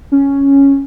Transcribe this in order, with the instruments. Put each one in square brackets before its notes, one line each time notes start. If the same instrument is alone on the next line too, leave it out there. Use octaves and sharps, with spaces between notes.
[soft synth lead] C#4